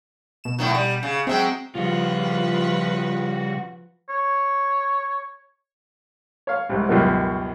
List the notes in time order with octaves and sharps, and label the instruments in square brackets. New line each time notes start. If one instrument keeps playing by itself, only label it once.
[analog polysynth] B2 E7
[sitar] A2 D#3 F#3
G3
C#3
[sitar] F#3 G#3 [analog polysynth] C4 E5 G5
[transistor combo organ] C#3 G3 [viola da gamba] F3 B4 [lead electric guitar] F4 F#4
[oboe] C#5
[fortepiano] C#5 F5
C2 G#2
C#2 F#2 B2 D#3 G3